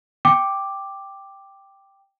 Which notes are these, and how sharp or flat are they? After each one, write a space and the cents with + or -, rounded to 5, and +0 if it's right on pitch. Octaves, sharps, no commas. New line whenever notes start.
G5 +0 D6 +5